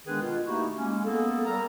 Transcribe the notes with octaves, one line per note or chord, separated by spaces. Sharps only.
D#3 G#3 B3 D4 G#4 B4
B2 F4
A3 A#3 D#4 E4 F#4 G4
G#3 A#3 C#4
A#3 B3 G#4 A4
G3 A#4 A#5